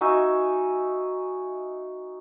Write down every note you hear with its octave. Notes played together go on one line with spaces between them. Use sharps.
D#4 F#4 E5 G#5